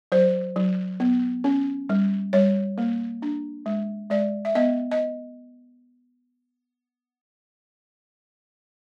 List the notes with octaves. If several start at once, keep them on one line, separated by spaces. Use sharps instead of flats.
F#3 C5
F#3
B3
C#4
G3
G3 C#5
A#3
D4
G#3
G#3 D5
E5
B3 D#5
D#5